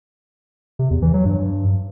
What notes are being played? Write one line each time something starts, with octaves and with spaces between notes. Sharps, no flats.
C3
E2
E3
F#3
G2